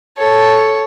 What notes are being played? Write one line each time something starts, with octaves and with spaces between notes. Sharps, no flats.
A4 C#5